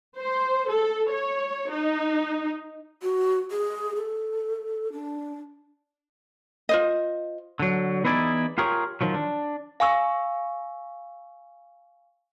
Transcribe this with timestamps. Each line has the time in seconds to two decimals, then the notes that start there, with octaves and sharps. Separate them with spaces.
0.18 C5
0.68 A4
1.11 C#5
1.72 D#4
3.02 F#4
3.51 G#4
3.96 A4
4.92 D4
6.69 F4 C5 D#5
7.60 D3 F#3
8.04 E3 B3 D#4 E4 G#4 D5
8.58 F4 G4 G#4 A#4 C#5
9.01 D#3 F3 F#3
9.14 D4
9.80 F5 G#5 C#6 E6